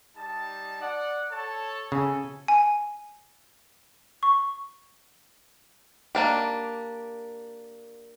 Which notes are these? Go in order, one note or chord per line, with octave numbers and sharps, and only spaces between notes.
G3 D#4 A5
D5 F#5
A4 C#5 A5
C#3 A4 G#5
G#5
C#6
A#3 D4 G4